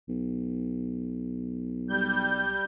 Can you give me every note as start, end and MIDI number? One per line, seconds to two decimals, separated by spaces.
0.09 2.59 35
1.89 2.65 55
1.89 2.65 91